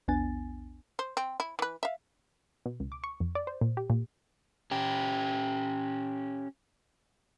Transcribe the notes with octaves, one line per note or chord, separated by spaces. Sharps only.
A#1 E2 B3 D4 G#5 A6
C5
C4
E4
E3 B4
E5 F5
B2
C#2
D6
C#6
F2
D5
C5
A#2
G4
A#2
C#4 G4